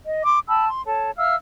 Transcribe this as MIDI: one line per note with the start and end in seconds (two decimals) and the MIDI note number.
0.06 0.23 75
0.24 0.39 84
0.24 0.39 86
0.49 0.68 79
0.49 0.68 81
0.49 0.68 83
0.49 0.68 88
0.69 0.81 84
0.86 1.12 69
0.86 1.12 73
0.86 1.12 81
1.17 1.35 76
1.17 1.35 77
1.17 1.35 88
1.17 1.35 89